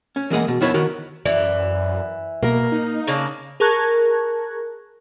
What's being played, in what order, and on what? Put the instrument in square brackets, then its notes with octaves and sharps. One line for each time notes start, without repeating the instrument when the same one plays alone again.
[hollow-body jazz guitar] C#4
E3 G#3 A#3 G#4 D#5 F#5
B2
F2 D#3 B3 E4 C#5 B5
D#3 F#4 A#4
[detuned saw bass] F#2 [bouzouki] E3 [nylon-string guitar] D5
[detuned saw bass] B2 [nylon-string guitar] A#3 A#4
[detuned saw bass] D#4
[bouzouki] C#3 A#3 D4
[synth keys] G#4 A#4 A5 C#6 F#6 G#6